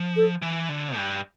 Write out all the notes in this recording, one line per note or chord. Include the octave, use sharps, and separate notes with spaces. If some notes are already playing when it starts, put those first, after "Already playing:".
Already playing: F3
A4
E3
D3
G2